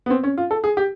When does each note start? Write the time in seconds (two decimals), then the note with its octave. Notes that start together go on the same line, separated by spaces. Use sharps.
0.06 B3
0.10 C4
0.24 C#4
0.38 F4
0.51 A4
0.64 G#4
0.77 G4